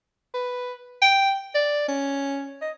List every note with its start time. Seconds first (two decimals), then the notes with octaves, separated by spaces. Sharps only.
0.34 B4
1.02 G5
1.55 D5
1.88 C#4
2.61 D#5